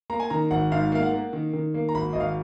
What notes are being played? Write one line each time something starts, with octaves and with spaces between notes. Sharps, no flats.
A#3 A#5
G#5
D#3 A#5
G#1 F#5
G#2 F5
A#3 F5
F#5
A#3
D#3
D#3
A#3
A#5
G#1 B5
G#1 D#5
F5